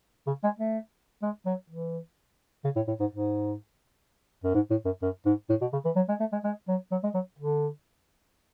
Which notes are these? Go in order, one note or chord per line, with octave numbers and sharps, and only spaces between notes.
C#3
G#3
A3
G#3
F#3
E3
C#3
A2
A2
G#2
G#2
F#2
G#2
A2
F#2
F#2
G#2
A2
B2
C#3
E3
F#3
G#3
A3
G#3
G#3
F#3
F#3
G#3
F#3
D3